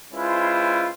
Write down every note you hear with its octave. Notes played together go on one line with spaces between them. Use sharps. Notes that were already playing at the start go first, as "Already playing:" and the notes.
G#3 C#4 E4 F4 B4 C5